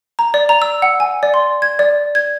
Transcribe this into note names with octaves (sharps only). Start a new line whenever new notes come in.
A#5
D5
A#5
E6
F#5
G#5
D5
C6
G#6
D5
G#6